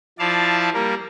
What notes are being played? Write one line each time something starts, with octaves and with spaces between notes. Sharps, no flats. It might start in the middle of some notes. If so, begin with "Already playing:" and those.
F3 E4 D5 F5 A5
G3 A#3 A#4